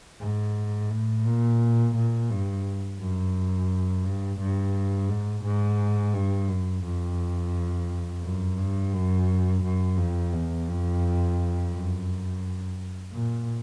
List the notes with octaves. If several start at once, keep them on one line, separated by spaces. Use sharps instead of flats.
G#2
A2
A#2
A#2
G2
F#2
G2
G2
G#2
G#2
G2
F#2
F2
F#2
G2
F#2
F#2
F2
E2
F2
F#2
A#2